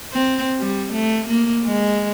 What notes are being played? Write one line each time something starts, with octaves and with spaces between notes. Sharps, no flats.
C4
G3
A3
A#3
G#3